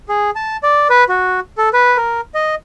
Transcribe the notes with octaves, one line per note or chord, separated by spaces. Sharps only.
G#4
A5
D5
B4
F#4
A4
B4
A#4
D#5